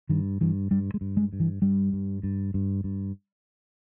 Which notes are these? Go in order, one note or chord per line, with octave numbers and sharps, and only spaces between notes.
G2 D#3
G2 E3
G2 G3
G#3
G2
G#3
G2
E3
G2 G3
G2
G2
G2
G2